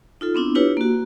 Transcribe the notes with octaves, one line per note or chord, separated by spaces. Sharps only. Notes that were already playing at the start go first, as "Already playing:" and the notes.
D#4 F4 A4
B3 C4 D4 E4
D4 E4 F4 G4 B4 C#5
A#3 F#4